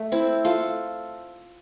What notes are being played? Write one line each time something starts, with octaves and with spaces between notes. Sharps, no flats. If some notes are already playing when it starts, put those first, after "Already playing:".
Already playing: A3
C4 E4
F4 A4